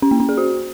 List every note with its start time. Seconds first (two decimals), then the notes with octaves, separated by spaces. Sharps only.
0.02 C#4
0.11 A#3
0.20 C#4
0.29 G#4
0.38 F#4